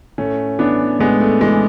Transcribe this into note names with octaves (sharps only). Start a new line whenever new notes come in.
A2 A3 C#4
E3 B3 D4
A2 G#3 B3
A3
E3 G#3